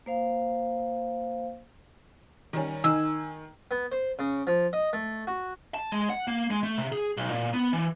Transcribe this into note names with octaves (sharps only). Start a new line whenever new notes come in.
A#3 C5 F5
D#3 G3 C#4
D#3 D#4 G#5 E6
B3
C5
C#3
F3
D#5
A3
F#4
A5
G#3
F#5
A#3
G#3
A3
C3
G#4
B1
A#2
B3
E3